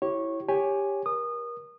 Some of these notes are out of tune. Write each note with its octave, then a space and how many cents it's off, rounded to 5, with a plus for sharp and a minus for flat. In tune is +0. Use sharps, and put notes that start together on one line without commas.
E4 +0 G4 -30 C#5 -15
G4 +15 C#5 +0 G#5 +0
A#4 +30 D#6 -25